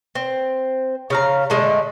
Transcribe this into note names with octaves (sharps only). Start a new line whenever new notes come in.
C4
C#3 F5 A#5
A#2 D3 G#3 A3